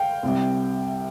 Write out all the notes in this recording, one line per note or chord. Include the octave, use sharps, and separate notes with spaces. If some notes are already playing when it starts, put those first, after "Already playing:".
Already playing: F5 G5
C2 C3 G3